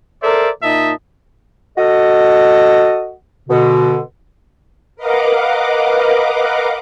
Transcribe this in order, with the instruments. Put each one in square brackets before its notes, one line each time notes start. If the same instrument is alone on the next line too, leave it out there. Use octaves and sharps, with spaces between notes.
[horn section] A4 A#4 C5 D5 E5
A#2 D#4 D#5 E5 A5
[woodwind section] F#4 A4 D#5
B2 D3
[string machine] A#4 B4 D#5 F5 F#5 D6